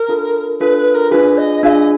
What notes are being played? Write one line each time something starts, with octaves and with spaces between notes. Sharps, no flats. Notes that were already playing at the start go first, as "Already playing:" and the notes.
Already playing: A#4
D4 F4 A4
D4 F4 A4 B4
B4
A#4
D4 F4 G#4 B4
D#5
D4 F4 G#4 D#5 F5